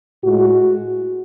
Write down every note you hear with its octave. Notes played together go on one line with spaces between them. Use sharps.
A2 G#3 F#4